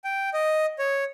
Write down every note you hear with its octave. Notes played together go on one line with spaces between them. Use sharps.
G5
D#5
C#5